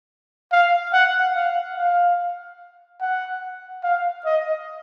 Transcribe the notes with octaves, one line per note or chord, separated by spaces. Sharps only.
F5
F#5
F5
F5
F#5
F5
D#5